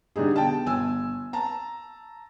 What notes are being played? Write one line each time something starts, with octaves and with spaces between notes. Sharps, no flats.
D3 G3 D#4 G#4
B2 G5 A5
G1 G#5 E6
A5 A#5